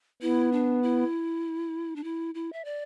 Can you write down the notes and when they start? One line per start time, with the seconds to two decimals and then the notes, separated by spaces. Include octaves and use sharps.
0.22 B3 E4
0.52 D4
0.83 E4
1.96 D4
2.04 E4
2.35 E4
2.53 E5
2.65 D5